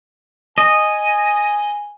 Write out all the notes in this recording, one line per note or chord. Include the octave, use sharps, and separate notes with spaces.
D#5 G#5